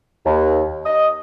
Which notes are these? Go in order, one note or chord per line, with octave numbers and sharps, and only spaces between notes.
D#2
D#5